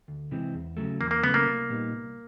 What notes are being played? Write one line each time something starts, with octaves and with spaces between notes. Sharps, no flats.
D2
C3 E3 G#3 C4
E2
C#3 F#3 A3
E2 A#3
A#3
C#3 F#3 A3 B3
A#3
C2
A#2 G3 B3 D#4
C2